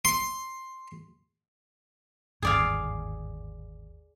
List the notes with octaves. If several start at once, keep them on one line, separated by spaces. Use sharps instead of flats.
C6
G1 D#2 G#2 G#4 D5 F5